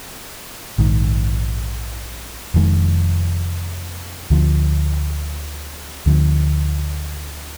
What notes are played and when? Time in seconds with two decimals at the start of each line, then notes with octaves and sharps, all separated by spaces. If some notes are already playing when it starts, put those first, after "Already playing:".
0.78 A#1 G#2 D#3
2.54 F1 F2 D#3 G#3
4.30 D2 D3 F3
6.06 D2 D3 F3